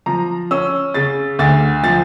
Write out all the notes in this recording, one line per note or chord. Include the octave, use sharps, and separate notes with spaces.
F3 A#5
C#4 E6
C#3 A6
D2 A6
F3 A6